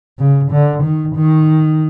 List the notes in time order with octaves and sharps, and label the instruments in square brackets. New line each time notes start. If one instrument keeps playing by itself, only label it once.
[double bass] C#3
D3
D#3
D#3